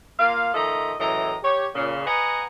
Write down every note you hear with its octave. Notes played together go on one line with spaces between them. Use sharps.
A#3 F4 F5
D#3 F3 A3 D#5 A#5
F#2 A2 E3 D#5 A#5
G4 C#5
A#2 C#3
B4 D#5 F#5 G#5 A#5